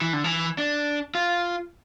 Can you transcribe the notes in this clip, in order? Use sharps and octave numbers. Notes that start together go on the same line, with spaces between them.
E3
D3
E3
D4
F4